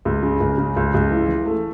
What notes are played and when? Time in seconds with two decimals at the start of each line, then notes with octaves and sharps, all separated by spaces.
0.05 C#2
0.23 C#3
0.40 C#2
0.58 C#3
0.76 C#2
0.94 C#2
1.11 E3
1.29 E3
1.46 A3